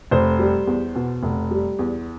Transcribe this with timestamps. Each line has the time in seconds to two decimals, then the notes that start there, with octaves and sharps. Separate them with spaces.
0.11 F1 C5
0.39 G3
0.67 E2
0.95 B2
1.23 F1
1.51 G3
1.79 E2